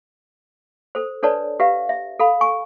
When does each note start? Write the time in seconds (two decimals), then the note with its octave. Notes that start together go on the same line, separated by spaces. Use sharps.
0.95 A4 C5
1.23 D4 A4 B4 C#5 D5 A5
1.60 G4 B4 E5 F5
1.89 E5
2.19 A4 F5 B5
2.41 G#5 C#6